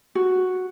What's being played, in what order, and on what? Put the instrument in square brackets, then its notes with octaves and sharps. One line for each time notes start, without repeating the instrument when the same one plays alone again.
[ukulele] F#4